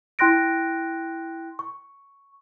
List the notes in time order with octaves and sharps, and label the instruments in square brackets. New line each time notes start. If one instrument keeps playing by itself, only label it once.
[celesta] E4 G5 C6 F#6 A#6 D7
C#6